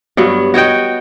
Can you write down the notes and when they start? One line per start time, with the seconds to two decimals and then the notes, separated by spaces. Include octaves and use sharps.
0.17 G2 F#3 B3
0.54 F#4 C#5 D#5 G5